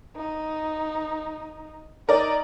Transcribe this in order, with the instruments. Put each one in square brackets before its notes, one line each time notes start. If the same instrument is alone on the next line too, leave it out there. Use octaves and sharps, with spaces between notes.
[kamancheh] D#4
[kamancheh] D#4 [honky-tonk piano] A#4 D5